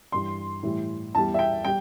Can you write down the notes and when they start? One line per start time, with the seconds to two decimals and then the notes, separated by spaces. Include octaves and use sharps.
0.12 G2 E3 G3 C6
0.63 A2 E3 G3
1.15 E2 E3 G3 A5
1.34 E5
1.39 G5
1.65 G3 G5